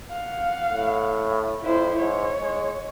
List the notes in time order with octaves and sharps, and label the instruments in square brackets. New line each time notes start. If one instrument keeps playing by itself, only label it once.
[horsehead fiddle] F5 F#5
[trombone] A2
[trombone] F2 [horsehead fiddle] E4 C5
[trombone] G#2 [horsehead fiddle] C#5
[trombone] G#3